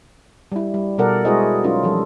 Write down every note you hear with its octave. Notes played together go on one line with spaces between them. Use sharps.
G3 E4
G3
B2 G3 A4 A#4 D5 F#5
G#3 E4 F#4 G#4 C5 D#5
F#3 C#4 D#4 F4 A#4
E3 F3 G3 A4